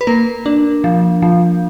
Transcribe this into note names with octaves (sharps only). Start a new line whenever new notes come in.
B4
A#3 A#4
D4
F3
F3